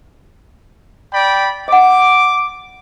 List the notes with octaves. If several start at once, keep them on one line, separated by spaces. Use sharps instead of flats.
D5 G5 B5
D#5 F#5 D6